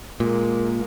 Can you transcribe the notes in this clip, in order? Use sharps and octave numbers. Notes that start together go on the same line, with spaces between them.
A#2 G#3 A#3